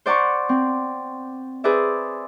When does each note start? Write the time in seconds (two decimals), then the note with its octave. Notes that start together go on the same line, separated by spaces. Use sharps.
0.06 C5 D5 F#5 A#5 C#6
0.49 C4
1.64 G#4 B4 C5 D5 E5